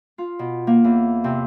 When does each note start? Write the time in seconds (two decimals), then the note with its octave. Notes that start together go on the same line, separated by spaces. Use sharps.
0.18 F4
0.39 B2
0.67 A#3
0.84 E2
1.24 C3